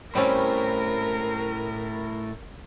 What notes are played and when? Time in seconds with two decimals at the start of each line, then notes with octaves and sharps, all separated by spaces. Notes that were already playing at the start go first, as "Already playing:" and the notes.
0.15 A2 G3 C4 C#4 A#4